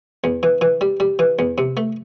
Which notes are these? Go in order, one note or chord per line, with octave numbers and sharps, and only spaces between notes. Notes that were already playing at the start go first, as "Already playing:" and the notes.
E2
E3
E3
G3
G3
E3
E2
C3
A3